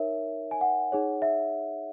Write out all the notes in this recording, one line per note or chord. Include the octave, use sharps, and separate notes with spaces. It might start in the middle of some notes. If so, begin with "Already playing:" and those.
Already playing: D#4 A#4 C#5 E5
G#5
F#5
D#4 G#4 C#5
E5